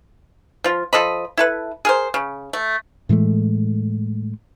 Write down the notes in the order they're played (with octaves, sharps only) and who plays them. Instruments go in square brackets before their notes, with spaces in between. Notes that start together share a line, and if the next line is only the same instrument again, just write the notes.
[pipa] F3 F4
F3 A4 D#5 B5
E4 A4 B4
G#4 A#4 C5
C#3
A3
[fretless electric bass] A2 E3 G#3 A3